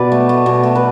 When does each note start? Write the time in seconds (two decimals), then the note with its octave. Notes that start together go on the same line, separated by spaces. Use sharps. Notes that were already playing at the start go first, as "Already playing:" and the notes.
Already playing: B2 B4 D5
0.12 A3
0.29 A3
0.46 B2
0.63 A3
0.76 B4